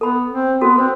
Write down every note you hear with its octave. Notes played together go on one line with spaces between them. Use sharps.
B3 A4 B5
C4
B3 F#4 A4
C4 C5